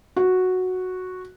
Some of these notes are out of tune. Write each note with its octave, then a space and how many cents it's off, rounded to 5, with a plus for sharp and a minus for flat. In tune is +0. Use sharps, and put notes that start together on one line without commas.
F#4 -5